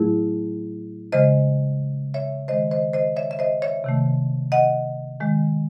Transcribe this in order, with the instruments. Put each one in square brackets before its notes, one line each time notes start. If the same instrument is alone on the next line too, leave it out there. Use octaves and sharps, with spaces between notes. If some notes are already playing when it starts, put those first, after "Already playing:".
Already playing: [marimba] A2 F#3 A3 E4 G#4
C#3 E3 G#3 C5 D#5
C#5 E5
D#3 G#3 C5 D#5
C5 D#5
C5 D#5
C#5 E5
E5
C5 D#5
C#5 E5
C3 D#3 A3
D#5 F#5
D#3 G#3